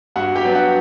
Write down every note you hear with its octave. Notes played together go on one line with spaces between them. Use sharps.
G2 F#4 F#5
G4 G5
F#3 B3 D4
F#4 F#5